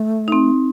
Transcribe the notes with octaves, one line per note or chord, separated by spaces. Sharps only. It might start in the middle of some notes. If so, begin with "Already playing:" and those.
Already playing: A3
D#4
C4